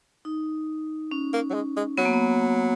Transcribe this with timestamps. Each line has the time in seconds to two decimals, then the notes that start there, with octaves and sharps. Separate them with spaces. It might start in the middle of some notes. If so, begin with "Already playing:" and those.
0.25 D#4
1.11 C#4
1.33 A#3
1.50 F#3
1.54 G#3
1.77 G#3
1.98 F#3 B3
2.05 A#3
2.13 B3